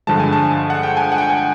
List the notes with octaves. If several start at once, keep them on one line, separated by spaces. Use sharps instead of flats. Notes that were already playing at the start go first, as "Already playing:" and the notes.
G2 D3 F3 G#3 A5
G#5
A5
F#5
G5
G#5
F#5
G5
G#5